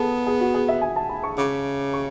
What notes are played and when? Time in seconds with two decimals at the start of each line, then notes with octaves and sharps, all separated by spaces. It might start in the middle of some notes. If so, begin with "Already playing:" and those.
Already playing: B3 G#4 A4 A5
0.27 G#4
0.40 F#4
0.54 G#4
0.69 E5
0.82 G#5
0.96 A5
1.10 B5
1.24 C#6
1.38 C#3 D6
1.94 C#6